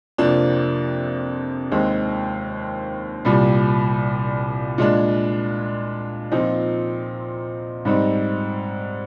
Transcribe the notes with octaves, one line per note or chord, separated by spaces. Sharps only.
F2 C3 F3 A#3 D4
D#2 D#3 G#3 C4
C2 A#2 G3
A#2 G#3 D4
A#2 F3 C4 D#4
G#2 G3 C4 D#4